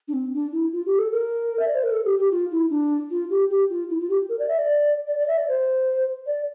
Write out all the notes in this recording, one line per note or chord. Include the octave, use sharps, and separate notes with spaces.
D4
C4
D4
E4
F4
G4
A4
A#4
E5
D5
C5
A#4
A4
G4
G4
F4
E4
D4
F4
G4
G4
F4
E4
F4
G4
A#4
D5
E5
D5
D5
D5
E5
D5
C5
D5